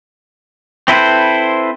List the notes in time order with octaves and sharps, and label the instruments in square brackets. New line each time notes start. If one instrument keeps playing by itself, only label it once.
[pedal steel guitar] C4 E4 A4 B4 C5